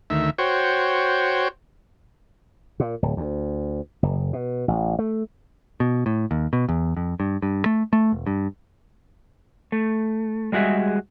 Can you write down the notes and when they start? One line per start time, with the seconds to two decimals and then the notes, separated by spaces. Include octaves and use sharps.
0.10 D2 D#3 E5
0.38 F#4 C5 C#5 G5
2.80 A#2
3.02 D1
3.17 D2
4.03 F#1
4.33 B2
4.68 A1
4.99 A3
5.80 B2
6.06 A2
6.31 D#2
6.53 B2
6.69 E2
6.97 F2
7.20 G2
7.42 G2
7.66 A3
7.93 A3
8.12 E1
8.27 G2
9.72 A3
10.52 G3 G#3 F#4 G#4 E5